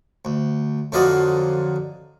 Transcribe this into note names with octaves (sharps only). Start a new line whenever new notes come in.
D2
F2 D3 F#3 D5 D#5 F5